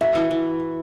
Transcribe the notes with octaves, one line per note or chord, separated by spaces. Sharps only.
F#4 E5
E3
E3